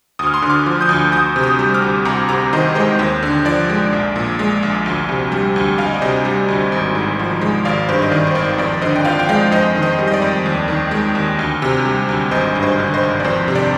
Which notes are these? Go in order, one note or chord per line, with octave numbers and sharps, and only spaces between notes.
D2 D#6
F6
C6 D#6
D3
D6 F6
F3
D#6 G6
D2
D2 D#6 G6
C3
D#6 G6
G3
D6 F6
D2
C2 A#5 D6
C3 A#5 D6
D#3 C5 D#5
G#3 C5 D#5
D#2 C5
D3
F3 D5
G#3
A#1
A#2
G#3
A#1
D2
C3
G3
D2
D2 F5
D#5
D5
C3 C5 D#5
G3
D2
G#1
G#2
F3
G#3
G#1 D5 F5
G2 C5
D#5
D#3 D5
C5
G#1 D5
F2 D5
D3 C5 D#5
G5
F3 D5 F5
G5
G#3 D5 F5
F2 C5 D#5
D#3
C5 D#5
G3
D#5
D5
F2
D#2
D#3
G#3
D#2
D2
C3
G3
D2
G#1 C5 D#5
G2
C5 D#5
D3
C5 D#5
G#1
D5
F2 C5
C3
D5